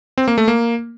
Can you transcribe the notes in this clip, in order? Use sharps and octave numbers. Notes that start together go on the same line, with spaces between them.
C4
A#3
A3
A#3